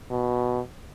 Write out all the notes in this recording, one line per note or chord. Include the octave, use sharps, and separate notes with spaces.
B2